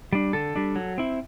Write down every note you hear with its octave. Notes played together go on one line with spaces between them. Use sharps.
G3 D4
D3 A4
G3 D4
F#3
C4 E4